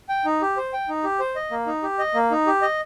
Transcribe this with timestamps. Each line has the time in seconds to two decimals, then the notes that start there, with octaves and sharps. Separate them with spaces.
0.09 G5
0.25 D#4
0.42 G4
0.57 C5
0.73 G5
0.89 D#4
1.04 G4
1.20 C5
1.36 D#5
1.51 A#3
1.67 D#4
1.83 G4
1.99 D#5
2.14 A#3
2.31 D#4
2.47 G4
2.62 D#5